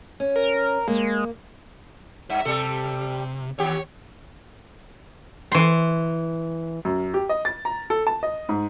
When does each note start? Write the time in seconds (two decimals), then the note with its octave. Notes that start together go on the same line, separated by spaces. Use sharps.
0.20 C#4
0.36 A#4
0.88 G#3 A#3
2.30 G2 E5
2.45 C3 G3 A4
3.59 D#2 G4 C#5
5.52 E3 C6
6.85 F#2
7.14 G4
7.29 D#5
7.45 A6
7.65 A#5
7.90 A4
8.07 A5
8.23 D#5
8.49 G#2